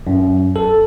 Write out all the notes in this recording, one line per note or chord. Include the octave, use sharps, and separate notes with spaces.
F#2
A4